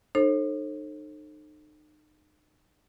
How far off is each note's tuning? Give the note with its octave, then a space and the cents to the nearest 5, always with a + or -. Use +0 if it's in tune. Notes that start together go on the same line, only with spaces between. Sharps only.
D#4 -35 A4 +0 C5 +40